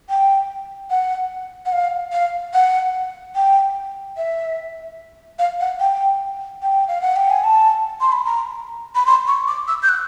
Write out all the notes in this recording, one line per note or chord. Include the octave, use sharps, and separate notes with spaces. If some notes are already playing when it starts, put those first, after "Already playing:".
G5
F#5
F#5
F5
F5
F#5
G5
E5
F5
F#5
G5
G5
F5
F#5
G5
G#5
A5
C6
B5
A#5
B5
C6
C#6
D6
E6
G6
F#6